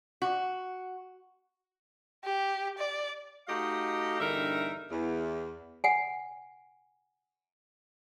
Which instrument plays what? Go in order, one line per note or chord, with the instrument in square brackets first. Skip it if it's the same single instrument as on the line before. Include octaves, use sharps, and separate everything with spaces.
[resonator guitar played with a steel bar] F#4
[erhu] G4
D5
[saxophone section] A3 D#4 F#4 G4 D#5 F5
E2 G2 D3 D#4 A#4 E5
E2
[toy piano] F#5 G#5